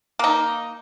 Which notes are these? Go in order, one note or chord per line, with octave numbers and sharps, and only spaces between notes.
A#3 D#4